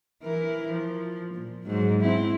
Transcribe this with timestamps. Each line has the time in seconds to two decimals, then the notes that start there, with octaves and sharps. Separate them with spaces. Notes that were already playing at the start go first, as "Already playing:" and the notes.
0.23 E3 E4 A#4
0.69 F3
1.34 A#2
1.66 G#2 F#3
2.01 C4 E4